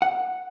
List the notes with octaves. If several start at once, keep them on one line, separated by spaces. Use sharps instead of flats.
F#5